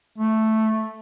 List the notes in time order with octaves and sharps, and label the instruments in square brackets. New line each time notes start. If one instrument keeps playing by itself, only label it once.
[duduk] A3